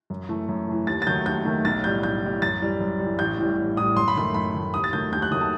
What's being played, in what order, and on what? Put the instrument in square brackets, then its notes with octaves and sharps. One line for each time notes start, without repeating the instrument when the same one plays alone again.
[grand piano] F#2
E3 A3
F#2
E3 A3
D#2 A6
A6
D#3 F#3 A3 G6
D#2 G6
D#3 F#3 A3
B1 A6
A2 G3 G6
B1 G6
A2 G3
F#2 A6
E3 G3
F#2
E3 G3
A1 G6
A2 E3 G3
A1
A2 E3 G3 D#6
F#2 C6
B5
D#3 A3 C6
F#2 B5
D#3 A3
D#2 D#6
A6
D#3 F#3 A3 G6
D#2 G6
F#6
D#3 F#3 A3 D#6
A5